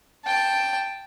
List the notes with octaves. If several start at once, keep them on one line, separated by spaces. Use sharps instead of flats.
G5 A5